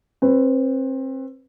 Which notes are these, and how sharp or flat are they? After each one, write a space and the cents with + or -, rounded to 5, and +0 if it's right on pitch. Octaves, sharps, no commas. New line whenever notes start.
C4 +30 B4 +5